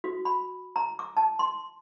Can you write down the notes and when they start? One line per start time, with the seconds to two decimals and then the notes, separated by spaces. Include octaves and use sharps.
0.04 F#4
0.25 B5
0.76 A#5
0.99 D6
1.17 A5
1.39 C6